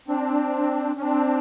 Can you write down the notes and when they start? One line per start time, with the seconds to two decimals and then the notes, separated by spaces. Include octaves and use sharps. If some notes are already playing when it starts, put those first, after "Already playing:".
0.08 C4 D4
0.97 C#4
1.02 C4 D4